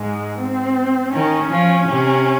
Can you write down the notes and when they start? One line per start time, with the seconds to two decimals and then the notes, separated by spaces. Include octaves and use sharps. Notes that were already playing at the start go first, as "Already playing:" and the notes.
Already playing: G#2 G#3
0.38 C4
1.13 D#3 C#4
1.51 F3
1.89 C3